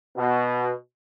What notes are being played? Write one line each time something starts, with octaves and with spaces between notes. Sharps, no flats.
B2